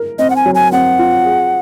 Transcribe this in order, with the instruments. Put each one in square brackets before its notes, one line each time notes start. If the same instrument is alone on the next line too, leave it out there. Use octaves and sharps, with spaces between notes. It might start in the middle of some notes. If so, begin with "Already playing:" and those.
Already playing: [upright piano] A#4
[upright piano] C4 [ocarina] D#5
[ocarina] F#5
G#5
[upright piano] F#3
[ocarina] G#5
[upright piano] C4 [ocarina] F#5
[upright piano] F4
G#4